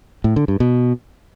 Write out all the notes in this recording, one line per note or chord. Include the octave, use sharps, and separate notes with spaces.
A2
D3
G2
B2